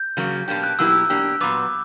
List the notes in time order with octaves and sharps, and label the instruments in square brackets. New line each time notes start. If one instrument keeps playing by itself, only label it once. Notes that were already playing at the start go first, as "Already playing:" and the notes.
Already playing: [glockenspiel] G6
[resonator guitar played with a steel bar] C#3 F#3 A#3
[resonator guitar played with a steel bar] B2 A#3 D4 G4 [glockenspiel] G6
[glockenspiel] F#6
[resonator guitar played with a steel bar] B2 F#3 A#3 E4 G4 [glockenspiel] E6
[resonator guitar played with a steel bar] B2 A#3 D4 G4
[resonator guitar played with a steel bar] A#2 F#3 B3 [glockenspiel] D6